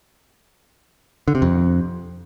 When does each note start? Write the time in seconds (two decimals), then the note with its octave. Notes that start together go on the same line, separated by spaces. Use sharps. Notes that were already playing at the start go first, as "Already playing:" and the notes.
1.28 D3
1.35 C3
1.42 F2